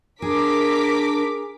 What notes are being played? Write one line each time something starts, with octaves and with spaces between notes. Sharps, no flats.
D4 G#4 A#4 D6 B6